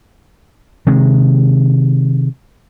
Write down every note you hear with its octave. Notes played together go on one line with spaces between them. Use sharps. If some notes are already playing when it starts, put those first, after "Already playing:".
C3 D#3 G#3